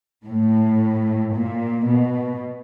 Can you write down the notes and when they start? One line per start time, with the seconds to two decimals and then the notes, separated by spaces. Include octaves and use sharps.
0.25 A2
1.34 A#2
1.88 B2